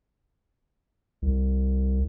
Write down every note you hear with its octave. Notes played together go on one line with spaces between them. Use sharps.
C2